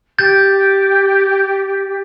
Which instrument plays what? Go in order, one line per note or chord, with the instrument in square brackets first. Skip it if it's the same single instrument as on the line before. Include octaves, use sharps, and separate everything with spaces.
[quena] G4 [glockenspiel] G6 A6